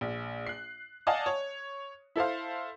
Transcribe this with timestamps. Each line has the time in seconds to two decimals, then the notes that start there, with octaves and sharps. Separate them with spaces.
0.01 A#1
0.47 F#6 C7
1.07 D5 D#5 F5 F#5 G#5 A5
1.26 C#5
2.16 E4 A4 C5 F5